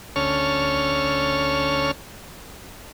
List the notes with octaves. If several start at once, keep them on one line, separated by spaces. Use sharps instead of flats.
D2 C#4 A4 C#5 F6